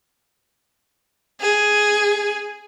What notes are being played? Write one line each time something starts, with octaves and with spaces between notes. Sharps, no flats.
G#4